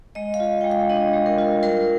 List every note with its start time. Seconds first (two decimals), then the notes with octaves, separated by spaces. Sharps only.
0.15 G#3 D#5
0.34 F5
0.40 F4
0.61 G#3 G5
0.71 F5
0.89 D4 D#5
1.13 G#3
1.26 A#4
1.38 F4
1.63 G3 A#4